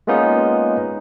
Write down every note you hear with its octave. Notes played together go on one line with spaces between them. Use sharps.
G#3 A#3 B3 C#4 D#4 F4